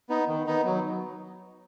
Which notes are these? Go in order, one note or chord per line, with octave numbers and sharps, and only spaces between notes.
B3 D#4
D#3
B3 D#4
F#3